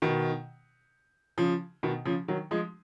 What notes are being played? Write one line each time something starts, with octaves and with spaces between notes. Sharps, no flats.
B2 D#3
C#3 F3
B2 D#3
C#3 F3
D#3 F#3
F3 G#3